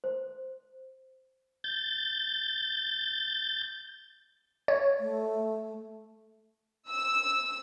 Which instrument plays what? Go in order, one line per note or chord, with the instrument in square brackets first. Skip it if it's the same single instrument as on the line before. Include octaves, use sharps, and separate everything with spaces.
[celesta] C5
[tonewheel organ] G6 A6
[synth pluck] C#5
[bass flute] A3
[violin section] E6